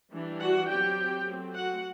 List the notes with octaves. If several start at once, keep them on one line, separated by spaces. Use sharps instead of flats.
E3 G3 D4
F#4 F#5
F#3 C4 G4 G5
F#3 A3 C4
F#4 F#5